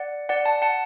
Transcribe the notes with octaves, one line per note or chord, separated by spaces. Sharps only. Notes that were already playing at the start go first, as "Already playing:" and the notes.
Already playing: D5 F#5
D5 F#5
F#5 A5
F#5 A5